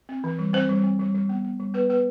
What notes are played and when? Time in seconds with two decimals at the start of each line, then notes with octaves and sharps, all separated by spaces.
0.09 C4
0.24 E3
0.39 G3
0.53 C4 C5
0.69 G3
0.84 C4
0.99 G3
1.15 G3
1.29 B3
1.44 B3
1.59 G3
1.74 B3 B4
1.89 B3 B4